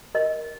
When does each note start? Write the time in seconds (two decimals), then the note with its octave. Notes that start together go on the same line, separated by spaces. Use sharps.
0.15 A#4 D#5